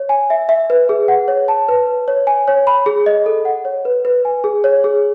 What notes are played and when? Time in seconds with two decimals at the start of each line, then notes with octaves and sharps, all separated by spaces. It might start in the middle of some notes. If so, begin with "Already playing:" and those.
Already playing: C#5
0.09 G#5
0.30 E5
0.49 E5
0.70 B4
0.89 G#4
1.08 F#5
1.28 C#5
1.48 A5
1.68 B4
1.87 B4
2.08 C#5
2.27 G#5
2.48 C#5
2.67 B5
2.86 G#4
3.06 D#5
3.26 A4
3.45 F#5
3.65 C#5
3.85 B4
4.05 B4
4.25 G#5
4.44 G#4
4.64 C#5
4.84 G#4